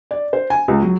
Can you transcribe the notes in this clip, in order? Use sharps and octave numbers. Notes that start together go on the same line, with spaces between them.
D5
C5
G#5
C#2
F#3